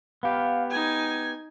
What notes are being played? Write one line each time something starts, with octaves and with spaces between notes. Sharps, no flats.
B3 G4 F5
D#4 G#5 G#6